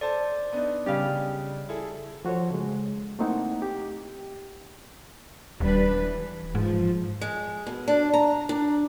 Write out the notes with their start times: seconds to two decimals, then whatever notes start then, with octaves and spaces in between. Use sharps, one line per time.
0.01 A4 C5 D5 A5
0.52 B3 D4 D#4
0.86 C#3 G3 C#4 F5
1.69 E4 G#4 A4
2.25 F3 F#4 A4 C5 C#5
2.51 C#3 G#3
3.19 A3 A#3 C4 D#4 E4 F#5
3.62 G4
5.60 D#1 G3 D4 B4
5.94 E3
6.55 G#2 F3
7.21 G#3
7.67 B2
7.88 D4
8.13 A#5
8.49 D4